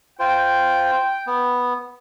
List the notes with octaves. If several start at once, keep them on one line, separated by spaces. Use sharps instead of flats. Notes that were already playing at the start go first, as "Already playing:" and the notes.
F4 C5 G5
B3